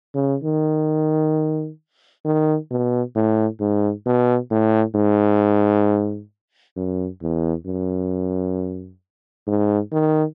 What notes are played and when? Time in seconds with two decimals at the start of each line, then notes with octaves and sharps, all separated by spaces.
0.15 C#3
0.43 D#3
2.25 D#3
2.71 B2
3.15 A2
3.60 G#2
4.06 B2
4.51 A2
4.95 G#2
6.76 F#2
7.22 E2
7.66 F#2
9.47 G#2
9.92 D#3